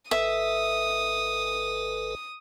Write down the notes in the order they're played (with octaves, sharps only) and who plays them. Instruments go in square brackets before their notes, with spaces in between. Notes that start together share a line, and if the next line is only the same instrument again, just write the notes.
[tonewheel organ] G#1 A4 B4 [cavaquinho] E5 [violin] D#6